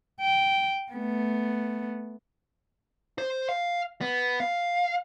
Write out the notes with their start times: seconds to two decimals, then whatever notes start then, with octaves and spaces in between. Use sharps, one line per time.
0.21 G5
0.92 A3 B3
3.18 C5
3.49 F5
4.01 B3
4.40 F5